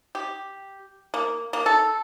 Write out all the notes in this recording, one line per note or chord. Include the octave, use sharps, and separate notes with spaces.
G4
A#3
A#3
A4